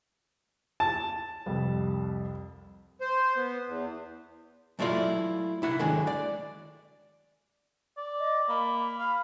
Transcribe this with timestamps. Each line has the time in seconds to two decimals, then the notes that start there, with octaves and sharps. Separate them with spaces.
0.80 A5
1.46 C2 F2 G3
3.01 C5
3.36 B3
3.67 E2
4.79 F#3 A3 E4 F4 D5 F5
5.62 C2 E4 F#5
5.79 D3 D#3 F#3 G#3
6.07 D5
7.97 D5
8.19 D#5
8.49 A#3 B5
8.99 F5 B5